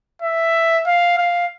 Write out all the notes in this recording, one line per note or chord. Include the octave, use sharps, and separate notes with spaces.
E5
F5
F5